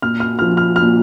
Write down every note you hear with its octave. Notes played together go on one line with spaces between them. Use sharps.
A#2 F6
F6
F3 F6
F6
F6
A#2